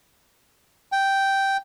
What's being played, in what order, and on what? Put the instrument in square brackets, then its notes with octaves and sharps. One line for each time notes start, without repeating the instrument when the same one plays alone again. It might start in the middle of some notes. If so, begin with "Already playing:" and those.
[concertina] G5